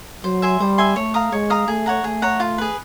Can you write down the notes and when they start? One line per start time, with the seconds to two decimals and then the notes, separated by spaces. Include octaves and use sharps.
0.24 F#3 C5
0.42 E5 G#5 C6
0.60 G3 C5
0.78 E5 G#5 C6
0.96 A3 C#5
1.14 F5 A#5 D#6
1.32 G#3 C#5
1.50 F5 A#5 D#6
1.68 A3 G#4
1.86 C#5 F#5 A#5
2.04 A3 G#4
2.22 C#5 F#5 A#5
2.40 F4
2.58 G#4 B4